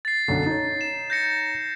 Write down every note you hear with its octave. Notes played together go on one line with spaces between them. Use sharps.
A6 C7
B1 F#2 D3
D#4 C#5
E7
G6 A#6 C#7